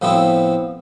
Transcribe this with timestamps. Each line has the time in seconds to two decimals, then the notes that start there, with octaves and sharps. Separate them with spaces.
0.02 A2 F3 B3 C4 E4